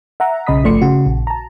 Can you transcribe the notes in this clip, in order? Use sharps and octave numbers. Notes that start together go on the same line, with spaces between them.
E5 F#5 A#5
B1 C#3 D#5 B5 D#6 B6
G1 F3 A3 D5 C6 C#7
C#3 F#4
A#1
A5 A#5